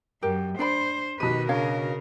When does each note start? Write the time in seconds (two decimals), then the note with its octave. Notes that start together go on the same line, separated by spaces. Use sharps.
0.23 F#2 G4 A#4
0.59 D4 C5 D5 B5 C7
1.20 B2 D#3 G4 B4 D#7
1.49 C#3 D4 A#4 C#5 F5